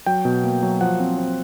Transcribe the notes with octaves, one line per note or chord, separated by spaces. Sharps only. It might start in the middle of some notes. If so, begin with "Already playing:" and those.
F#3 G5
B2
A#3
F#3
F3 F#5
C4
C4